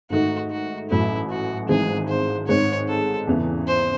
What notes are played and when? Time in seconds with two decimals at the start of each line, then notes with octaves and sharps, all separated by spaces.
0.10 G#2 D#3 A3 D#4 F#4
0.51 F#4
0.89 A1 A2 F#3 A3 E4
1.30 F#4
1.69 G#1 G#2 E3 G#3 C4 G#4
2.08 C5
2.47 G#2 D#3 G#3 C4 C#5
2.88 A4
3.27 E2 C#3 E3
3.67 C5